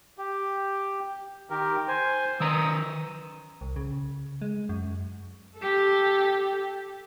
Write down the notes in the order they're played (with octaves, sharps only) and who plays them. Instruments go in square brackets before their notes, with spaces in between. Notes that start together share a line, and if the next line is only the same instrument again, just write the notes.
[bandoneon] G4
D#3 G4 A#4
C5 G#5
[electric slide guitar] D#3 B4 A#5 [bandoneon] D#6 E6
[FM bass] C2
C#3
G#3
F#2
[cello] G4 A4